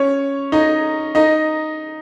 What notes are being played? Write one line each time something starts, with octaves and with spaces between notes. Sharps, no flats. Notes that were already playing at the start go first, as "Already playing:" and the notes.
Already playing: C#4 C#5
D#4 D#5
D#4 D#5